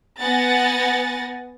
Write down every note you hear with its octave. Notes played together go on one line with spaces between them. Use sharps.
B3 F#5 G#5 A6 A#6